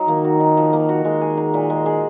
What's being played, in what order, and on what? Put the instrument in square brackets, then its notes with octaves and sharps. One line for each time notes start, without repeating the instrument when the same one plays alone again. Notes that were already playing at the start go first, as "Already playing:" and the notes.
Already playing: [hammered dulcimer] F#3 D#4
[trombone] D#3 [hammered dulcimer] A#3
[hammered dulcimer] F#4
D#4
F3
A#3
F#4
[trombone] D#3 [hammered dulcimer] G#3
[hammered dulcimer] G#4
D#4
A#2
G#3
G#4